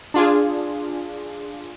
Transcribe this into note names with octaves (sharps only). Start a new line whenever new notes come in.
D4 F4 G#4